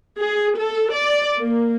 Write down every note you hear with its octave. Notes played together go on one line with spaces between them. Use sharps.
G#4
A4
D5
A#3